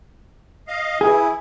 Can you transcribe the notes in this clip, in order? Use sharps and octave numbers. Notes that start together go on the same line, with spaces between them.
D#5 F5
E3 E4 G#4